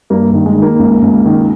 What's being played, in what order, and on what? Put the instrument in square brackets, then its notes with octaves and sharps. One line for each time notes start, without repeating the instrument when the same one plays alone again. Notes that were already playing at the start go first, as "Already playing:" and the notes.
[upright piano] G2 A#3
D#3
G#3
D#3
A#3
C#2
C#2
D#3